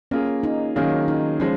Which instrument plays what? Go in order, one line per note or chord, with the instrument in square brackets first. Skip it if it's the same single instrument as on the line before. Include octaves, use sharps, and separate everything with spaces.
[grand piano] A#3 F4 G#4 [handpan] C#4
[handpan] D#4
[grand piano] D#3 F#3 A#3 F4 G#4 [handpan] C#4
[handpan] D#4
[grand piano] F3 G#3 [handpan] C#4